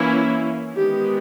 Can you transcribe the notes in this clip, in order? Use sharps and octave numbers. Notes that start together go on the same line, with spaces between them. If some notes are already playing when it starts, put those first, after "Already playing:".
Already playing: E3 A#3 C#4 E4
D#3 G#3 B3 G4